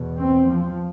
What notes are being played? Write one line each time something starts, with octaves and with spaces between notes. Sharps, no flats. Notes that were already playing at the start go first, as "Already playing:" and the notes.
Already playing: E2 B2
C4
F3